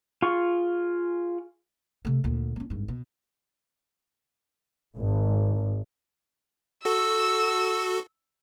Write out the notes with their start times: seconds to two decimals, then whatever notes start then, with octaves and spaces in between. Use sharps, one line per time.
0.22 F4 G#4 C#6
2.05 C3 A3
2.24 D2 A#2
2.56 A#3 C#4
2.70 G#1 G2
2.88 B2
4.97 G#1
6.85 F#4 A4 E6